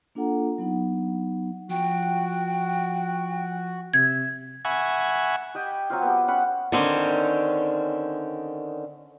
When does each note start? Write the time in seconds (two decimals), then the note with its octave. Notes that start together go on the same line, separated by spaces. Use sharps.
0.15 A#3 D4 F4 A4 F#5 A#5
0.58 F#3 B3 D#4 F#5
1.70 F3 F#4 G5
3.94 C3 E5 G#6
4.65 E5 F#5 G#5 B5 C#6
5.54 G4 D#5 G5
5.90 F#3 C4 F4
6.02 B3 G4
6.28 C#4 F#5 B5
6.72 D3 D#3 C4 C#4